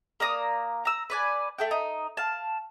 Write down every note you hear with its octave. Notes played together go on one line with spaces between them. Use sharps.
A#3 D5 A#5 D#6
A#5 E6
B4 D5 G#5
A3 A4 G5
D#4
F5 A5